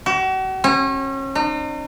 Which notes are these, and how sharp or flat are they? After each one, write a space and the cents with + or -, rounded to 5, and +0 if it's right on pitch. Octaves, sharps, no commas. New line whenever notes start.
F#4 +40
C#4 -35
D#4 -40